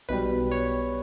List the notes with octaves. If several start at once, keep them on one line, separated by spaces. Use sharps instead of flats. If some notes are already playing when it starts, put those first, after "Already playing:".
B1 B2 G3 B4
C#5